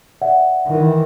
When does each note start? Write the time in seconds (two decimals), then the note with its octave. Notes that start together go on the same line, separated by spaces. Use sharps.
0.22 D5 E5 F#5
0.66 D#3 E3